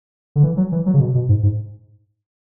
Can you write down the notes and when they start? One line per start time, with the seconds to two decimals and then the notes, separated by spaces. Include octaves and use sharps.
0.36 D3
0.43 E3
0.57 F#3
0.72 E3
0.86 F#3
0.94 C#3
1.00 B2
1.15 B2
1.29 G#2
1.43 G#2